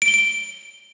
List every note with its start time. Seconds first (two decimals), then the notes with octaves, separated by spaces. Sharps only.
0.02 D7
0.08 G7
0.14 D7